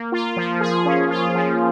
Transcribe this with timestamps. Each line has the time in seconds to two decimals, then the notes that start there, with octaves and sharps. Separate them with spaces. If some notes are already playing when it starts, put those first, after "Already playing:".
Already playing: A#3
0.12 F4
0.37 F3
0.60 G#4
0.85 C#4
1.10 F4
1.35 F3